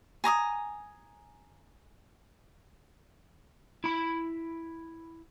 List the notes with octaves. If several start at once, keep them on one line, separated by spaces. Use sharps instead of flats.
G#5 A#5 D6 D#6
E4 B5